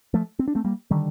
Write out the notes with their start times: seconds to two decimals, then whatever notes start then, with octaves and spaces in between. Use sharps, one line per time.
0.14 F3 A3
0.39 C4
0.48 D4
0.55 A3 C4
0.65 G3 A#3
0.91 D3 D#3 G3